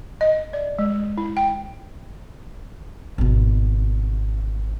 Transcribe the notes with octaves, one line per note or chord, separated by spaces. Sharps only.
D#5
D5
G#3
E4
G5
G#1 B2